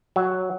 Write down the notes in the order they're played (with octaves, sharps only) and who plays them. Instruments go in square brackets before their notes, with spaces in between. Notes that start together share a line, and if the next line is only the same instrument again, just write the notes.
[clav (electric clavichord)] F#3